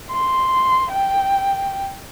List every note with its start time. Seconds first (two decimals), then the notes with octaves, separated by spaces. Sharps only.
0.11 C6
0.92 G5